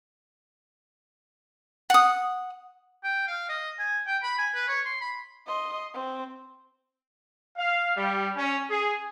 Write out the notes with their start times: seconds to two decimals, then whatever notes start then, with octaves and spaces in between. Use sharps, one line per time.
1.90 F#5 D#6
3.04 G5
3.27 F5
3.49 D#5
3.79 G#5
4.07 G5
4.23 B5
4.38 G#5
4.54 B4
4.68 C#5
4.85 C6
5.01 B5
5.47 D#5 C6
5.94 C4
7.57 F5
7.96 G3
8.37 C#4
8.70 G#4